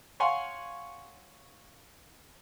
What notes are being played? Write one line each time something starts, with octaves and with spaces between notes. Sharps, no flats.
C#5 F5 F#5 G#5 C6 C#6